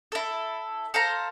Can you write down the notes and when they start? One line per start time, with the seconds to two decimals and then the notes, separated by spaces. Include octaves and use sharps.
0.12 E4 A4
0.94 A4 C5 F5 A#5